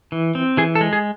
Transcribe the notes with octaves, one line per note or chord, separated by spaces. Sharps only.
E3
C4
E3 G#4
A4
G#3
G#4